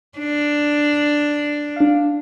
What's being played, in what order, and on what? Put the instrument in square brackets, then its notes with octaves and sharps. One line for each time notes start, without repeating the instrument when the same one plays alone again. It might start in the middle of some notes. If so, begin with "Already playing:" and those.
[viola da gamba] D4
[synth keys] D4 F5